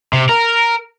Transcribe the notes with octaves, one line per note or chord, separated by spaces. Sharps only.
C3
A#4